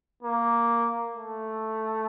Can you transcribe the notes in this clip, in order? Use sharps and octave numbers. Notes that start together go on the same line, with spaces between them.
A#3
A3